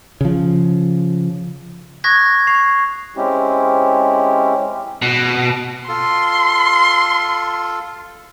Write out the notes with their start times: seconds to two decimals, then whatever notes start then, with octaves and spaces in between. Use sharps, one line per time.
0.21 C#3 F3
2.04 C#6 D#6 F#6 G#6 A#6 B6
2.47 C#6 C7 F7
3.17 G#3 C4 C#4 E4 G4
5.02 B2
5.88 F4 A4 C6